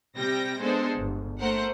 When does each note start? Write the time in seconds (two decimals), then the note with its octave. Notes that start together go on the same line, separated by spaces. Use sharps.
0.18 C3 G3 G5 A#6
0.61 G#3 B3 D4 A4 C5
0.99 G1
1.39 A3 A#4 C5 F#5